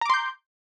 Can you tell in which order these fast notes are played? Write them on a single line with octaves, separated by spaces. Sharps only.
A#5 D6 C6 G6